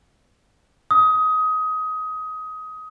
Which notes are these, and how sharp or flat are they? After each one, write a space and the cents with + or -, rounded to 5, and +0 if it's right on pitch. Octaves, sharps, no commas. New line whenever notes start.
D#6 +20